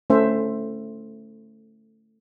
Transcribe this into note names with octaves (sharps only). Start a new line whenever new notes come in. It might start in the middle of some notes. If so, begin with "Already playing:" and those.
A3 C#4 C5 E5